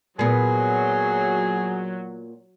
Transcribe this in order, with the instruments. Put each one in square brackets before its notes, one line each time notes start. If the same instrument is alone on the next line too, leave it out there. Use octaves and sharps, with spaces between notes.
[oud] A#2 B3 [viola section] F#3 [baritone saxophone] G#4